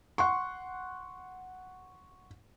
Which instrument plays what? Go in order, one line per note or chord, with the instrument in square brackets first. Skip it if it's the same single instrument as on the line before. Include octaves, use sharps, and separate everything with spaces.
[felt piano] F#5 C6 C#6